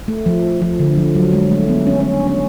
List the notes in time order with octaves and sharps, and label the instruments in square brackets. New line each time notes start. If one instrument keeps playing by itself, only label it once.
[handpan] A3
F3
F3
D3
F3
F#3
G#3
A3
B3
C#4
C#4
D4
C#4